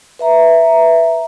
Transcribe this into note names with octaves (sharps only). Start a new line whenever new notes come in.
B4 E5 A#5